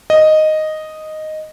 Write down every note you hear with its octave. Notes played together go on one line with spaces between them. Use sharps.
D#5